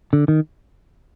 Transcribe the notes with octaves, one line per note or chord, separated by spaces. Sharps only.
D3
D#3